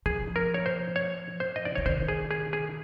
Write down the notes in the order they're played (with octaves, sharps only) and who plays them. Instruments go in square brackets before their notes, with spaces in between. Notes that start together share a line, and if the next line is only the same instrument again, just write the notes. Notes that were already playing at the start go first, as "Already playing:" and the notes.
[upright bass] F3 [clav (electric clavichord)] G#4
[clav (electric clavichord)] A#4
C#5
C5
C#5
C5
D#5
D5
[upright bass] D3 [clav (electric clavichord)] C#5
[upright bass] D#3 [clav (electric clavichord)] C5
[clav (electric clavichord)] G#4
G#4
G#4